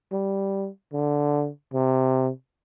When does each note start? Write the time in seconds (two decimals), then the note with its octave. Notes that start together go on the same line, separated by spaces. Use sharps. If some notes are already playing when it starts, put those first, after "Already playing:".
0.12 G3
0.93 D3
1.74 C3